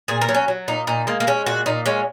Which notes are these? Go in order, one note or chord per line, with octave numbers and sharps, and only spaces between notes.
A#2 G#4
A#4
F#3
C#4
F#3
A#2 D#4
A#2 D#4
G#3 A#3
A#3
G#3 C#4
A#2 F#4
A#2 D#4
G#3 C#4